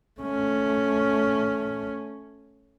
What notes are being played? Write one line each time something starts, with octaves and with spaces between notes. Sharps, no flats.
A3 C#4